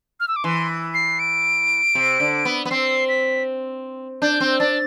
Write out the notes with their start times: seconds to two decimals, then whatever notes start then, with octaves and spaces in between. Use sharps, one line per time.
0.20 F6
0.28 E6
0.36 D6
0.44 E3 C6
0.94 C7
1.19 D7
1.95 C3
2.20 D3
2.45 B3
2.65 B3
2.71 C4 C7
3.09 B6
4.22 D4 G6
4.40 C4
4.60 D4 A6